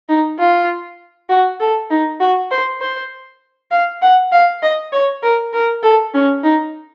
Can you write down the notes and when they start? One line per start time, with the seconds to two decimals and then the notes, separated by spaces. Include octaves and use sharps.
0.09 D#4
0.39 F4
1.29 F#4
1.60 A4
1.90 D#4
2.20 F#4
2.51 C5
2.81 C5
3.71 F5
4.02 F#5
4.32 F5
4.62 D#5
4.92 C#5
5.23 A#4
5.53 A#4
5.83 A4
6.14 C#4
6.43 D#4